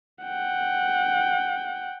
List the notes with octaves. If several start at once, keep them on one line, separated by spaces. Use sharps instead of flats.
F#5 G5